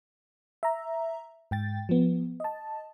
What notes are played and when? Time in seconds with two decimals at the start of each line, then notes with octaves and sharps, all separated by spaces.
0.63 E5 A#5
1.51 G#2 G5 A6
1.89 F3 B3
2.40 D#5 A5